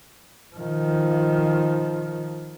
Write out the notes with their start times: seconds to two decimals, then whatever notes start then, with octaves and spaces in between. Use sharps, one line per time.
0.55 D#3 F3